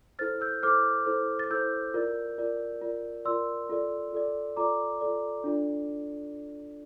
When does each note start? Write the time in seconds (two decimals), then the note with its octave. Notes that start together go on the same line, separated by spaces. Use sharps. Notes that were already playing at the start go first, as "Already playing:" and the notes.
0.19 E4 A4 C5 F6 A6
0.41 E6 G6
0.63 E4 A4 C5 D6 F6
1.06 E4 A4 C5
1.39 A6
1.50 E4 A4 C5 E6 G6
1.94 F4 A#4 D5
2.38 F4 A#4 D5
2.82 F4 A#4 D5
3.25 F4 A#4 D5 C6 E6
3.69 F4 A4 D5
4.13 F4 A4 D5
4.56 F4 A4 D5 A#5 D6
5.01 F4 A4 D5
5.44 D4 F4 A4 D5